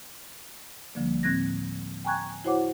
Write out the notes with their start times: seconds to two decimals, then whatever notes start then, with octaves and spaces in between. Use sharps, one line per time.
0.95 D2 D3 F3 G3 A#3
1.23 A2 C4 F#6 G#6 A#6
2.05 G5 G#5 A#5 C#6 F#6 G#6
2.45 E4 F#4 C5 C#5 F#5 D6